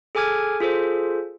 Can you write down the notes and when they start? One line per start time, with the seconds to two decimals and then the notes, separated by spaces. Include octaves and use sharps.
0.15 G#4 A4 G#5 D6 F6 G#6
0.60 F4 G#4 A4 C5